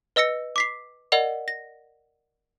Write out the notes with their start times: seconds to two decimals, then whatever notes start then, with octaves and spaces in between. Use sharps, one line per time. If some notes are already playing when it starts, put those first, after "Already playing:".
0.16 B4 D#5 E6 A#6 C#7
0.56 D6 B6 C7
1.12 A#4 D5 D#5 F#5 F7
1.48 A#6